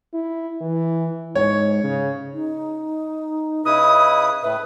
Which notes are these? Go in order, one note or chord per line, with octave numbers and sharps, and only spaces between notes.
E4
E3
G#2 C#5
C#3
D#4
C#3 E4 B4 D#5 D#6
A2 B4 E5